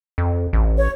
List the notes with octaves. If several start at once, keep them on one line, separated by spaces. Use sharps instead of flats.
F2
A1
C#5